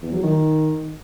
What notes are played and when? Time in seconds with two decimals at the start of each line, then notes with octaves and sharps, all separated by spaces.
0.02 E2
0.12 F#3
0.23 D#3